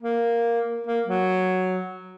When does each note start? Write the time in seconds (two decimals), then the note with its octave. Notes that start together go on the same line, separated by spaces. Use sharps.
0.03 A#3
0.87 A#3
1.07 F#3